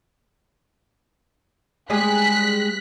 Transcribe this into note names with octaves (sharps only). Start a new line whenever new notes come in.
G3 G#3 G#4 F#6 B6